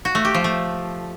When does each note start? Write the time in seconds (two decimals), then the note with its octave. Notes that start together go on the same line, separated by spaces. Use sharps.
0.05 F#4
0.15 A3
0.25 G4
0.34 F3
0.44 A3